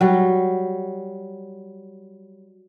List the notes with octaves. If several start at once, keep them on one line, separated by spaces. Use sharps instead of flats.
F#3 G3